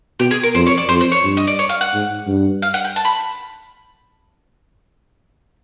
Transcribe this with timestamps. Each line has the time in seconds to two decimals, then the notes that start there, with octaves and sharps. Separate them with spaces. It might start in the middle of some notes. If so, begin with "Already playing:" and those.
0.20 B2 G4
0.31 G#4
0.43 A#4
0.55 F2 C5
0.67 C#5
0.78 D5
0.89 F2 C5
1.01 C5
1.12 C#5
1.24 G2
1.37 D#5
1.47 D5
1.59 C#5
1.69 F5
1.81 F#5
1.93 G#2
2.27 G2
2.62 F5
2.74 F#5
2.85 G5
2.96 A5
3.05 B5